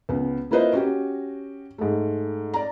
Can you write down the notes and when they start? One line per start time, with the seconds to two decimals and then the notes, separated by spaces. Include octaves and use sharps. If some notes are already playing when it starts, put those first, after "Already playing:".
0.09 C#2 B3
0.51 A#3 E4 F4 B4 C5 D#5
0.73 C#4 F#4 G4
1.78 G#2 A3
2.54 D5 A#5